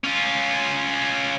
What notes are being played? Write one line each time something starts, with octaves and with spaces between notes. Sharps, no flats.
C#4 F4